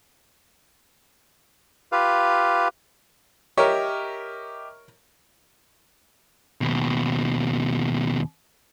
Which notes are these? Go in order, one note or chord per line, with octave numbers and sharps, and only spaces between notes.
F4 G4 B4 F5
G4 A#4 C#5 D#5 E5
D#2 B2